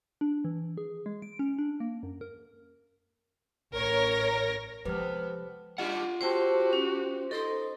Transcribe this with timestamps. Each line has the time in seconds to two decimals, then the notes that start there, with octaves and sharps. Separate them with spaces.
0.21 D4
0.45 E3
0.78 G#4
1.06 G#3
1.22 D7
1.39 C#4
1.59 D4
1.80 A#3
2.03 F#2
2.21 A#4
3.75 A1 A#4 C#5 A#6
4.85 C3 F3 G#3 B3 A4 B4 F6
5.78 G3 D4 F4 G4 F#5
6.21 C4 F#4 G4 C5 G5 A5
6.73 C#4
7.31 D#4 A4 C5 D#5